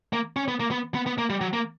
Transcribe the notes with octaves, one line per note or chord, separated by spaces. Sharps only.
A#3
C#4
B3
A#3
B3
B3
B3
A#3
G3
F#3
A#3